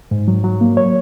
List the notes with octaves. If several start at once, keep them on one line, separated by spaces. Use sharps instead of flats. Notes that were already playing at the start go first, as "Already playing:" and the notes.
G#2
F#3
F#3
A#3
C#5